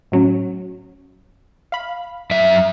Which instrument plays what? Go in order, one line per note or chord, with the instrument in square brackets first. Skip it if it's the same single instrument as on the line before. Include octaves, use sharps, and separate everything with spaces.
[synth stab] A2 F#3 C#4
F5 B5
[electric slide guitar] F#2 E5